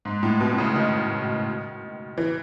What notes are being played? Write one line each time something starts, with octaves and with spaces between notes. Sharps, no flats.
G#2
A2
B2
B2
C#3
D#3
E3